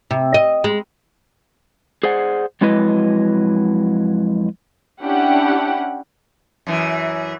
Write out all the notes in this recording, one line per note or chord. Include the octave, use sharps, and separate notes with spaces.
C3
D#5
G#3
G#4 C5 D5 F#5
F2 F#3 G#3 E4 B4 D#5
C#4 D4 E4 G4 F#5
F#2 E3